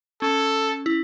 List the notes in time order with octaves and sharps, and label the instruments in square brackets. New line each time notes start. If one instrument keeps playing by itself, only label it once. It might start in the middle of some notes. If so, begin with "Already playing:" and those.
[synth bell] C#4 [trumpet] A4
[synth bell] E4